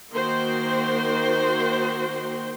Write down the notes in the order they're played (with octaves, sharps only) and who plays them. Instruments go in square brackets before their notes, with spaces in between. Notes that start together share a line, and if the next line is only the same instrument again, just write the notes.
[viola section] D#3 A#3 F#4 C5 G5 C6